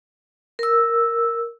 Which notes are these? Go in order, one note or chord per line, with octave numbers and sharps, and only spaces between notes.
A#4 E6